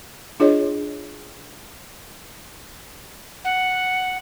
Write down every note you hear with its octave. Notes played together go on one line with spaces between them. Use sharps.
D4 F4 G#4 C#5 D#5
F#5